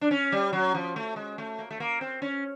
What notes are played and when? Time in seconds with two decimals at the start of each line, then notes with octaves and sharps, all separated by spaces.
0.01 D4
0.11 C#4
0.32 G3
0.53 F#3
0.74 F3
0.96 A3
1.16 G#3
1.38 A3
1.59 A#3
1.71 A3
1.80 A#3
2.01 C4
2.22 C#4